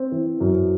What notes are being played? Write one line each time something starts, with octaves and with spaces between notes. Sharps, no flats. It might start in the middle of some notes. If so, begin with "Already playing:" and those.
Already playing: C4
E3
F#2